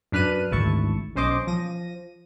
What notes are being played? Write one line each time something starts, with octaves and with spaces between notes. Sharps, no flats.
F#2 D4 B4 F6 F#6 D#7
G#1 D2 E4 A5 C#6
B1 C#4 C5 D#5 D6
F3 A#6 D#7